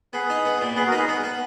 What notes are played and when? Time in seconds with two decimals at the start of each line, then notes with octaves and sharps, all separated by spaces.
0.13 B3 G#4 B4
0.30 D#4
0.45 B3
0.61 A#2
0.76 B3 G#4 B4
0.87 F#4 A#4
0.92 D#4
0.98 G#4 B4
1.08 B3
1.24 B3